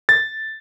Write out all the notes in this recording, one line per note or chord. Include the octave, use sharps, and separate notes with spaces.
A6